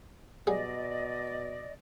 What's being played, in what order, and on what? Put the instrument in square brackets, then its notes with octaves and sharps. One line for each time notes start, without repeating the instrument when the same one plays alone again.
[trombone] B2 [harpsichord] F#3 G3 G#4 [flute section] D5 D#5